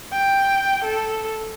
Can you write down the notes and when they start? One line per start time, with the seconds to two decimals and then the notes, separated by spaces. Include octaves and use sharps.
0.12 G5
0.84 A4